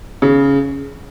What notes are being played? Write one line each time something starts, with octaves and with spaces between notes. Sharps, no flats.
C#3